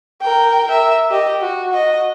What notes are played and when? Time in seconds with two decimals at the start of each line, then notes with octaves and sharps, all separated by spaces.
0.22 A#4 G5
0.68 A#4 E5
1.11 G4 D#5
1.41 F#4
1.71 F#4 D#5